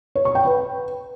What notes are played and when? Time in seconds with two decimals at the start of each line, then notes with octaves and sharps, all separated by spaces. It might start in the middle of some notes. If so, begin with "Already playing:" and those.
0.15 C#5
0.25 C#6
0.35 G5
0.45 B4